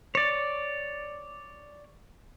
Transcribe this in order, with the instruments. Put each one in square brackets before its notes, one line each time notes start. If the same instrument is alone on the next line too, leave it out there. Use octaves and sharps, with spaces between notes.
[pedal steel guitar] C#5 D5